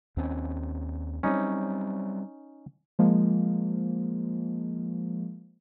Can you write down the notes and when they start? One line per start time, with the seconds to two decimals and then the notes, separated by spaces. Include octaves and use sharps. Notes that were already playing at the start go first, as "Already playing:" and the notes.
0.17 D#2 C4 C#4
1.23 F#3 G3 C4 C#4 D#4
2.99 F3 G#3 A#3